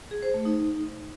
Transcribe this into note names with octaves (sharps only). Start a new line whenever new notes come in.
G#4
C5
A3
D#4